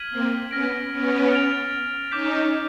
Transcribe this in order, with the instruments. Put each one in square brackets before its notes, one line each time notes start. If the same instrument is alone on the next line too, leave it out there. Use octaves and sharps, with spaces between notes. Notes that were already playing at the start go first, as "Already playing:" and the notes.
Already playing: [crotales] F6 G#6 B6 D#7 F#7
[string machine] A#3 C4
[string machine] B3 C#4 [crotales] F6 A#6 D7
[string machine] B3 C#4
[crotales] F6 A6 D7 F7
[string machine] C#4 D#4 [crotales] D6 G6 B6